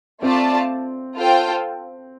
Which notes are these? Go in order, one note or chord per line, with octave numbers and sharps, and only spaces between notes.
A3 C4 F4 D5 A5
F4 A4 C5 G5